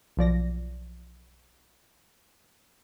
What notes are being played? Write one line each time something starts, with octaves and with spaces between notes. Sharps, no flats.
B1 F3 D5 A#6